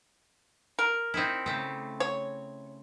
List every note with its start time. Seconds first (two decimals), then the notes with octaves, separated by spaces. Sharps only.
0.79 A#4
1.14 C4 D#4 E4
1.46 C#3 A3 C4
2.00 C#5